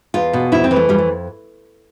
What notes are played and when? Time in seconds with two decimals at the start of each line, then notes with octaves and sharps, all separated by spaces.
0.14 E2 F4
0.33 B2
0.52 F2 E4
0.64 C4
0.71 E3
0.76 A3
0.89 F2 G3
0.98 A3